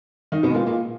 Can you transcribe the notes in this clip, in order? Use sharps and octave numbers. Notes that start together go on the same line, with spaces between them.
D#3 D#4
B2 B3
G#3
A#2 A#3
A#2 A#3